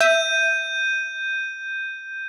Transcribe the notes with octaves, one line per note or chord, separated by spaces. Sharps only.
E5 G6 D#7